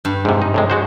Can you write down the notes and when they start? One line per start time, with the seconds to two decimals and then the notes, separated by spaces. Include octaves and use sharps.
0.05 G2
0.25 G#2 C3
0.42 D#4
0.54 A2 C3 G#3
0.70 G#3 F#4 C5